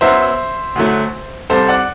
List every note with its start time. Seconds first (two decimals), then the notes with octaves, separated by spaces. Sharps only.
0.01 F#2 F#3 B3 C5 E5
0.76 D2 D3 F#3 A3
1.50 C2 C3 G3 A4 C5
1.68 D5 F#5